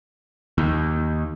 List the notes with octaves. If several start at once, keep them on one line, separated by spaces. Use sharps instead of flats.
D#2